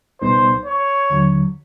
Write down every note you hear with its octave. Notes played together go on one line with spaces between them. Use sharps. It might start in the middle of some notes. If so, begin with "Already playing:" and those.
C#2 B2 G3 B3 D#4 C5
C#5
D#2 D3 F#3